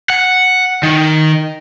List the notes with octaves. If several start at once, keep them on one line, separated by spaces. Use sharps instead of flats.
F#5
D#3